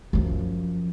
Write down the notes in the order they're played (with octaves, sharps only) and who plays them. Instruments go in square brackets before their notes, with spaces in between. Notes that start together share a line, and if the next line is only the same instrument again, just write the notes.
[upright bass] F#2 F3